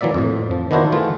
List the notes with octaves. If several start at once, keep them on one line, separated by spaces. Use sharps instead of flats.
E3 F#3 A#3 D5 E5
F2 A2
F3
D#3 B3 D4 E4 F#4 C5
E3 A3 F4 G#4